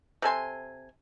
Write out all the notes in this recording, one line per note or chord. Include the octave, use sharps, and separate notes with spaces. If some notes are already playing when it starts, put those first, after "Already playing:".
C3 A4 G#5 C6